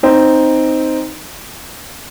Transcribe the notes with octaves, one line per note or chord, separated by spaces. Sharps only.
C4 D#4